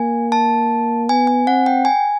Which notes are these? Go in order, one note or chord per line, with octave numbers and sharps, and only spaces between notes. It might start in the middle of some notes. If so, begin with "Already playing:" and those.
Already playing: A#3 G#5
A5
B3 G#5
G#5
C4 F#5
G5
G#5